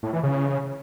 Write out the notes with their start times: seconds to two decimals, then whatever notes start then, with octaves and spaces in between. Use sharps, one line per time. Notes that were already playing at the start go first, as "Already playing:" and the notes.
0.03 A2
0.13 E3
0.23 C#3